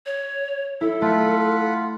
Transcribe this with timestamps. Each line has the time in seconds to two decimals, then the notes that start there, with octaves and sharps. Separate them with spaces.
0.06 C#5
0.81 E4 A4
1.02 A3 F4 F#5 B5